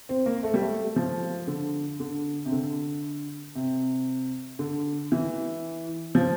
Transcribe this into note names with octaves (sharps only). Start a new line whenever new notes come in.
C4
A#3
A3
G3
A3
F3
D3
D3
C3
D3
C3
D3
E3
F3